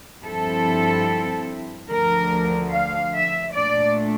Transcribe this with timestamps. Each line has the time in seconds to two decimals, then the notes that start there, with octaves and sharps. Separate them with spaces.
0.24 G2 F3 C4 E4 A4
1.88 D2 D3 F3 A#4
2.71 F5
3.13 E5
3.53 A#2 A3 D4 D5